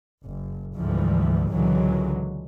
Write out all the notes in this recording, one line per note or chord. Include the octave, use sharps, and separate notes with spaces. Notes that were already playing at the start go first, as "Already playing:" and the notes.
F#1
D2 G#2 E3 F3 G3
C#2 A#2 D3 E3 F#3 G#3